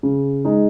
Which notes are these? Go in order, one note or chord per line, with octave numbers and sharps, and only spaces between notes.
C#3
G#3 D#4